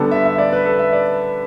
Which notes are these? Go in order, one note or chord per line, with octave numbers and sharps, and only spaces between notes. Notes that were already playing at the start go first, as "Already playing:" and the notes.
Already playing: D3 G3 B3 D4 A4
E5
E5
D5
B4
A4
E5
D5